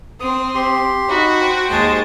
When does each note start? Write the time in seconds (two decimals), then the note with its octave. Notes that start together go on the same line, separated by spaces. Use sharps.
0.20 C4 D#6
0.55 G4 C6
1.10 D#4 F#4 B5 C#6
1.41 C5 G5 C#6
1.71 D#2 G#3 A5